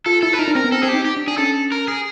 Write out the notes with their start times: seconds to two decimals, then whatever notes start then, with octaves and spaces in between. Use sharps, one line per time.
0.06 F4 A4
0.22 E4 A4
0.33 B4
0.39 D#4 A#4
0.48 D4
0.55 C4 A#4
0.64 B3
0.72 C4 A4
0.83 C4 G#4
0.89 G4
0.94 D#4
1.05 G4
1.17 D4
1.27 D4 G#4
1.38 C#4 A4
1.72 A#4
1.88 G#4